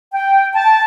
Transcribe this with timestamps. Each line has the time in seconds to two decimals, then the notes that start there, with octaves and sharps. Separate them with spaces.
0.13 G5
0.54 A5